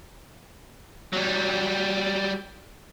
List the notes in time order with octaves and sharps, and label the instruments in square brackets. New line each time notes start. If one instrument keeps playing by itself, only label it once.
[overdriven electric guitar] F#3 G3